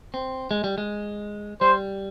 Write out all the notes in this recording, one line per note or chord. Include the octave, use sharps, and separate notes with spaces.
C4
G#3
G3
G#3
G3 C5